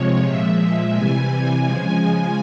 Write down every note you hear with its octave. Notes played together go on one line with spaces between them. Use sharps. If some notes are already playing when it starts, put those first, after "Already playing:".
Already playing: C3 F3 G#3 C#5
A#2 F3 G#3 E5
C3 E3 G3 G#5
C#3 F3 G#3 G#5